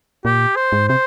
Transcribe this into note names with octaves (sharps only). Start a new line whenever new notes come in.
A#2 G4
C5
G#2
C3 C5